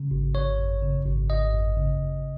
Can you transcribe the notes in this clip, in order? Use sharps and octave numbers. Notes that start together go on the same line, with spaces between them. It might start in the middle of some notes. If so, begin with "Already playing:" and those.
Already playing: C#3
G#1
G#1 C#5
F#2
C#3
G#1
G#1 D#5
F#2
C#3
G#1